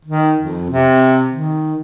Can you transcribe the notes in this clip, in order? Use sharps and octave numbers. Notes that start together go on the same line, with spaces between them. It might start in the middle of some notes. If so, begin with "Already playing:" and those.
D#3
F2
C3
D#3